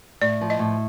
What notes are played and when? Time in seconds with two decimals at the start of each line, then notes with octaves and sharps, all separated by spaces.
0.22 A2 D5
0.41 F3
0.50 D#5
0.59 A2